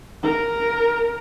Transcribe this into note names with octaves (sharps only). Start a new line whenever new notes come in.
A#4